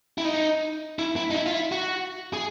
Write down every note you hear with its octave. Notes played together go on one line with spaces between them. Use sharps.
E4
D#4
E4
E4
D#4
E4
F4
E4
F#4
G#4